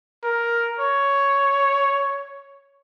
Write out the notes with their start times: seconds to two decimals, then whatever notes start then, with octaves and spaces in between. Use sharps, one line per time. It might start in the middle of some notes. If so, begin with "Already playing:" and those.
0.23 A#4
0.79 C#5